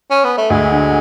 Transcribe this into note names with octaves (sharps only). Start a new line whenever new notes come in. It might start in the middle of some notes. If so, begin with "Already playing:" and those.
C#4
B3
A3
D2 G#3
D3